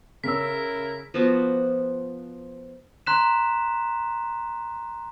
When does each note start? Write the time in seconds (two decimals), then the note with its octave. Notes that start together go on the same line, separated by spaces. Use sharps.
0.24 C#3 E4 A#4 C#5 E6 B6
1.14 F3 B3 F#4 D6
3.06 A#5 C6 F#6 B6 E7